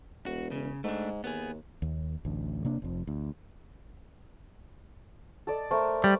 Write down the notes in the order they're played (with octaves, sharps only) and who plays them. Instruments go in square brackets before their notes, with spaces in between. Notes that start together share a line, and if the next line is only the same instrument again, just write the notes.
[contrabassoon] E1 [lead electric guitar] F#4
[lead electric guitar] C#3
[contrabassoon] G#2 [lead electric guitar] A3 D4
[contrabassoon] D#2 [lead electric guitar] B3 G#4
[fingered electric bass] D#2
A1 D2
C3 A#3 D4
F1 F2
D2
[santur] A4 D5 D#5
A3 A#4 C5
[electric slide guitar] G3 [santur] D5